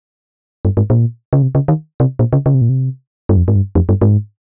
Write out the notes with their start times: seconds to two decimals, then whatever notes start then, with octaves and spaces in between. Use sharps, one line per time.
0.65 G2
0.77 G#2
0.90 A#2
1.33 C#3
1.42 C3
1.55 C#3
1.68 D#3
2.00 C3
2.19 A#2
2.33 C#3
2.46 C#3
2.54 C3
2.61 A#2
2.69 C3
3.29 G2
3.37 F2
3.48 G#2
3.56 G2
3.75 F2
3.89 G2
4.02 G#2